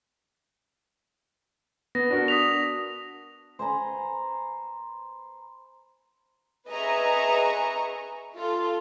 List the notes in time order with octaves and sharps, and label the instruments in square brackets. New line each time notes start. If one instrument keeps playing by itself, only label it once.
[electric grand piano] B3 [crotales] A#6
[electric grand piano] D4 F#4 A#4
[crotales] D#6 B6 F7
[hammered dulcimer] C5 G#5 A#5 B5
[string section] G#4 B4 D#5 E5 A#5 C#6
F4 A4